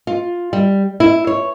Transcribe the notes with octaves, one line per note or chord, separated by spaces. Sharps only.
F4
G3
E4
C#5